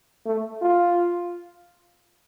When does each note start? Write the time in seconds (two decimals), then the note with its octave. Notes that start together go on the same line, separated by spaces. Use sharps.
0.26 A3
0.62 F4